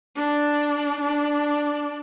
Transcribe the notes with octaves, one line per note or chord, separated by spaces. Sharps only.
D4
D4